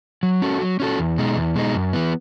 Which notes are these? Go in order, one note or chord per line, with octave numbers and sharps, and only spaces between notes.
F#3
C#4 F#4 A4
F#3
C#4 F#4 A4
E2
B2 G#3 D#4
E2
B2 G#3 D#4
F#2
E3 B3